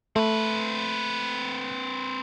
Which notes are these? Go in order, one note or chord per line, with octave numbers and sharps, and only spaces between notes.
A3 C4 B4